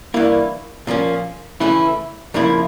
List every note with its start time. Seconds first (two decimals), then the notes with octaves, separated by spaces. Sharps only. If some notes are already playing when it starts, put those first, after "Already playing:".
0.14 G2 E3 A#3 E4
0.87 A#2 F3 A#3 C#4
1.60 C#3 E3 A3 C#4 E4
2.34 F2 C#3 F3 A#3 E4